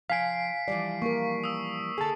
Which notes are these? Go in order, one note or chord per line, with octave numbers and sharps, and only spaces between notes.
F3 F5 G#5 B6 C7 D7
E3 F3 G3 D5
A#3 A#4 C#6
D#6 E6
D3 G#4 A4 A5